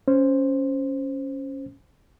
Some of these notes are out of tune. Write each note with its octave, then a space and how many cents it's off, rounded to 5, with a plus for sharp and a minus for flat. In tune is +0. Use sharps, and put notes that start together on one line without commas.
C#4 -5 C5 +0